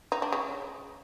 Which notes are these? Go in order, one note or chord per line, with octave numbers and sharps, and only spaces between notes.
D#4
D4
C#3